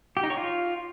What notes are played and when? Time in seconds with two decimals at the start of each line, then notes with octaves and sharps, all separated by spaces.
0.17 G4
0.23 D#4
0.30 C#5
0.37 F4